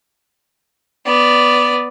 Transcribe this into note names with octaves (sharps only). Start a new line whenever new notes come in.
B3 D5